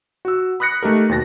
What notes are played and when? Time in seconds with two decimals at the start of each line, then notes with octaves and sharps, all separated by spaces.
0.25 F#4 E6
0.60 B5 D#6 F#6 A#6 C#7
0.83 A3 D#4 G4 A#4
1.09 D#2 B2 A6 A#6